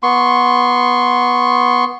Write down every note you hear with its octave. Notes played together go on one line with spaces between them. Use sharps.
B3 C6 C#6